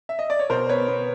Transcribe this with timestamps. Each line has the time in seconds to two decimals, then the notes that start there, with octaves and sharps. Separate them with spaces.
0.09 E5
0.19 D#5
0.30 D5
0.39 C#5
0.50 B2 A#4 C5
0.69 B3 B4 C#5
0.88 B3